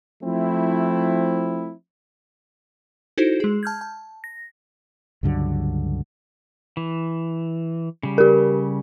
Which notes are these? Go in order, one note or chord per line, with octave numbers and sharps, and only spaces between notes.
F3 A3 C4 E4
D#4 E4 F#4 A4 C5
G#3 G#4
A5 F6 G6 G#6
A5
A#6
C#2 G2 D3 F#3
E3
C#3 G3
G4 A#4